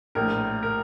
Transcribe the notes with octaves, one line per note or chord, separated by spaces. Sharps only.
A#1 A2 A#4
A#4